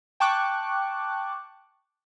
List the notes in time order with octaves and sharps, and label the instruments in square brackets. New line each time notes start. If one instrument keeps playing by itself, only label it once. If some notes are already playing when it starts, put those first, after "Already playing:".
[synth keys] G5 A5 C#6 D6 F#6